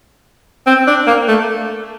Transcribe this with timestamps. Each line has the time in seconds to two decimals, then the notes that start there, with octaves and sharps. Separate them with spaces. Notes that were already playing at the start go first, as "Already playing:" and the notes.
0.67 C4
0.87 D4
1.07 A#3
1.28 A3